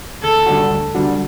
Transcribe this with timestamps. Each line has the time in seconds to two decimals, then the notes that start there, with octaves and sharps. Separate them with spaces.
0.23 D2 A4
0.46 D3 G3 D4 F#4
0.70 D2
0.95 D3 G3 D4 F#4